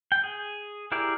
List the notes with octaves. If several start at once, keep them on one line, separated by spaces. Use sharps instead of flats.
G5
G#4
E4 G4 G#4 A#4 D5